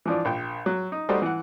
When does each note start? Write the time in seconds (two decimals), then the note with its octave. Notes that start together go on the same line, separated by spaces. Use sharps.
0.06 E3 F3 D4
0.25 A#1 G5
0.66 F#3
0.92 D#4
1.09 G3 A3 D#4 F#4 C5
1.22 E3 F#5